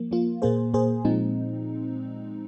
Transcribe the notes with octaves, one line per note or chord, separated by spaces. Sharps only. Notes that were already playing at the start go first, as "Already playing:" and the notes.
Already playing: F3 A#3
F3 A#3 F4
A#2 A#3 G#4 C5
A#2 A#3 G#4 C5
A#2 F3 G#3 C4 D#4